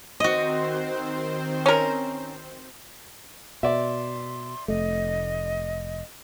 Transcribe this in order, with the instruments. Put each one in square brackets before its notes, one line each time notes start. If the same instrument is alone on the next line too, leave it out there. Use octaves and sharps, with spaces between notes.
[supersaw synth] D#3 C4 C5 [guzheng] F#4 D#5
[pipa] C#4 A#4
[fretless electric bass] B2 [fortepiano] D5 E5 [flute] C6
[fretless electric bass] F1 A3 [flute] D#5